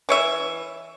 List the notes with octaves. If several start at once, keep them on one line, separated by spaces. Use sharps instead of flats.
E3 C#5 E5